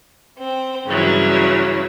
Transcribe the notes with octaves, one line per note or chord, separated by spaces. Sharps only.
C4
G2 C#3 E3 F#3